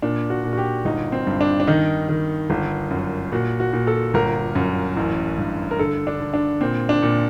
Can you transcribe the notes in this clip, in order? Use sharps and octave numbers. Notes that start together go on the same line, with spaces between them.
A#2 D4
F#4
A#2
F#4
G4
G1 D#4
C4
G2
D4
D4
D#3 D#4
D#3
G1
F#2
A#2 F#4
F#4
A#2
A4
G1 A#4
F#2
A1
G2
A#4
D3 A4
D4
D3
D4
A#2 C4
D4
A#2